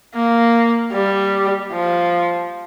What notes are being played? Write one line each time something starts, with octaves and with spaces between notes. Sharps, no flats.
A#3
G3
F3